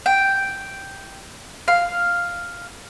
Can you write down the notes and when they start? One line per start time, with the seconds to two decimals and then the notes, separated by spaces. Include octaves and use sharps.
0.06 G5
1.68 F5